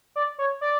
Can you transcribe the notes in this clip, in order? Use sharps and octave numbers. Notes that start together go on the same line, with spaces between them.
D5
C#5
D5